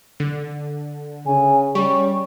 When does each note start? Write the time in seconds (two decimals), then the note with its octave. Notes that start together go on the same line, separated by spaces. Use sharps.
0.20 D3
1.26 C#3 G#5
1.75 G3 C#4 C#6